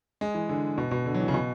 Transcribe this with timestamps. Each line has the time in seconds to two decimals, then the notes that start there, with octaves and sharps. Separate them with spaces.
0.21 G#3
0.35 E3
0.49 D3
0.78 B2
0.91 B2
1.06 D3
1.14 F#3
1.20 E3
1.28 C#3
1.34 B2